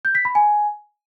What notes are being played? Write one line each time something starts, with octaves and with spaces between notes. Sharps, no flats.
G6
B6
B5
G#5